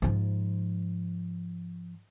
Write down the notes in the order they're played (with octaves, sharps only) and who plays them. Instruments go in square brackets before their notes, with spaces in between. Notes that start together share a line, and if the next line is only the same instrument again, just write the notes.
[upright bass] G#2 F3